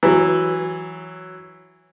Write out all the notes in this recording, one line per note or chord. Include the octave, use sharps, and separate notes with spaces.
E3 F#3